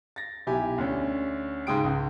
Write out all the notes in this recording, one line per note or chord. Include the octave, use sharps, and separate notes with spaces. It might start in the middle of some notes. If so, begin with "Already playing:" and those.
A6 A#6
B1 E4 G4 G#5
D2 C#4
G#2 C#3 G#3 G5 D#6 D7
C#2